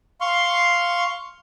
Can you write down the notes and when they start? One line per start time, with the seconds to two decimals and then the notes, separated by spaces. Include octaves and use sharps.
0.21 F5 C6 C#6